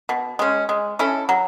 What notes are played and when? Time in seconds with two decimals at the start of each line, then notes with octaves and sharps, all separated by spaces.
0.09 B2
0.39 G#3 C#4
0.69 G#3
0.99 C#4 E4 A4
1.29 F#3